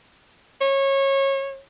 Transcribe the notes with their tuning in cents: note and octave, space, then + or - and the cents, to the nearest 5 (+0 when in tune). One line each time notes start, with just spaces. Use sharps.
C#5 -25